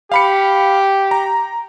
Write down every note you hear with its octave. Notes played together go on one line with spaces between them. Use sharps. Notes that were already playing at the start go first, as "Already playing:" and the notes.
G4 F5 B5 C#7
A#5